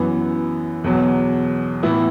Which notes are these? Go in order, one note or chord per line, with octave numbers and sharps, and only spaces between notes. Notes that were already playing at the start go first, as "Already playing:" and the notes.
Already playing: F#2 E3 B3
E2 B2 F#3
A2 E3 B3 E4